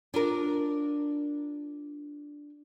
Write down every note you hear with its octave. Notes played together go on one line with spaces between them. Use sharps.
D4 F4 A#4